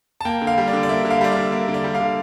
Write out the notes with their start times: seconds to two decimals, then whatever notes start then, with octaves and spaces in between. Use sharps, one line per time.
0.21 A5
0.25 A#3 G5
0.41 D3
0.47 F5
0.58 G3
0.68 D5
0.73 D3
0.83 D5
0.89 A#3 E5
1.05 D3
1.11 F5
1.21 G3 D5
1.32 D3 E5
1.52 A#3
1.68 D3
1.74 D5
1.84 G3
1.95 F5
2.01 D3